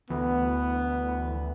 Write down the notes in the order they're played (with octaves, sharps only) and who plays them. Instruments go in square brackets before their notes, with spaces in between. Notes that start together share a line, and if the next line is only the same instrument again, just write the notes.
[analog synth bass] D2 [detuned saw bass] E3 [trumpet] B3